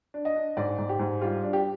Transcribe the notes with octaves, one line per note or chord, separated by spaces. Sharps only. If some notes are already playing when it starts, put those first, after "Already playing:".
D4
D#5
D4
G#2 D5
G#2
G4
G#2
G3 F4
D4
G4